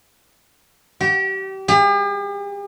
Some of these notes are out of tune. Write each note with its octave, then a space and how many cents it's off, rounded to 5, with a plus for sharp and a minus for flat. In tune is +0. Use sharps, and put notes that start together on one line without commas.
G4 -30
G4 +45